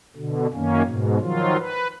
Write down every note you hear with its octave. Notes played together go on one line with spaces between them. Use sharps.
B2 D3
F#2 D#3 A#3 C#4
G#2 B2
D#3 F3 F#3 F4
B4